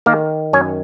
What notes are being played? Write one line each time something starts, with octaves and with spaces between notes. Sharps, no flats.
D#3 A#3 A#4
F#2 C#4 C#5